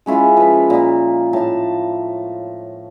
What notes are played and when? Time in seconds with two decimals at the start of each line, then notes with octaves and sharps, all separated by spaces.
0.06 G#3 C#4 E4 F4
0.37 F3 B4
0.70 A#2
1.33 A2 A5